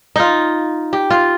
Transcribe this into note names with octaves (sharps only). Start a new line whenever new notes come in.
D#4 F4
G4
F4